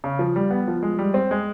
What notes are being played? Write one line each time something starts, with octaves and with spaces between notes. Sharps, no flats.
C#3
F3
G3
B3
F3
G#3
G3
C4
G#3